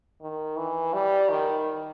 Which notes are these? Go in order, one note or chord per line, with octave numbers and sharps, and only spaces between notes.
D#3
E3
G3
D#3